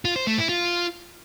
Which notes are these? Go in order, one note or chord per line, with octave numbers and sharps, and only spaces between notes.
F4
C5
A3
E4
F4